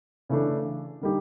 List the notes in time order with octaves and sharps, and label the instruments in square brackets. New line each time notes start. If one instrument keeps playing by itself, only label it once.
[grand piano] C#3 E3 A3 D4
D3 G3 A#3 D#4 G4